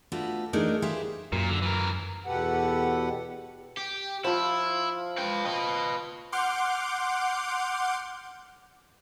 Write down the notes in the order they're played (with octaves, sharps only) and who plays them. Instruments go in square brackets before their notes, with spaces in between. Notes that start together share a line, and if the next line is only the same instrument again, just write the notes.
[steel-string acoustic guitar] A3 D4 F4 F#4 B4
E3 A3 D4 D#4 G#4 A#4
G4 G#4 B4 C5 E5 F5
[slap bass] F#2 [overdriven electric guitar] A#2
[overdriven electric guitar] D3
E3 A#4
[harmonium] E2 B2 G4 A4 B4 F#5
[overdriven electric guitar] G4
[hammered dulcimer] F3 F4 [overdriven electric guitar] E4
[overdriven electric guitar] B4 G5
B4 D#5
[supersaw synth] F#5 C6 D6 F6 G6